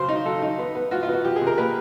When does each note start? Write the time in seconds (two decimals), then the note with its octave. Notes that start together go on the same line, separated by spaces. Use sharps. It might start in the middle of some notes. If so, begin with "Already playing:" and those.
Already playing: C#3 F#3 C5
0.09 D#4
0.25 F#3 A4
0.42 D#4
0.58 B3
0.75 B3
0.91 F4 F#4
1.03 F4
1.08 B3
1.13 F#4
1.25 F3 G4
1.36 G#4
1.41 C3
1.47 A#4
1.58 A#3 B4